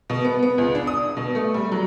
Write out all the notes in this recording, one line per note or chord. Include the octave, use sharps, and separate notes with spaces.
B2
B3
B3
C#2
D4
D#6
B2
A3
G3
F#3